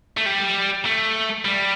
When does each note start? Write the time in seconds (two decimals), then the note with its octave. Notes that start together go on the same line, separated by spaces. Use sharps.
0.17 A3
0.26 G3
0.85 A3
1.45 G3